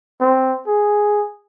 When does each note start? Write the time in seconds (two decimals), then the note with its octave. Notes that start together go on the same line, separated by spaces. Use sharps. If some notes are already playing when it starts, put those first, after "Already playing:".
0.21 C4
0.67 G#4